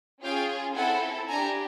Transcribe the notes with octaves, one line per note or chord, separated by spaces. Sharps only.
C#4 F4 G#4 F5 G5
C4 E4 A4 F#5 G#5
D4 G4 G#5 A#5